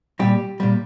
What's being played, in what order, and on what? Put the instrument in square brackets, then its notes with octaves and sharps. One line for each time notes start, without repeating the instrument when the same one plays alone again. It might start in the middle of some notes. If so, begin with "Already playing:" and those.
[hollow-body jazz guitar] A#2 G3 G4
A#2 G3